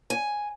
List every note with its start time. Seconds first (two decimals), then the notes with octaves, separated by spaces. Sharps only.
0.10 G#5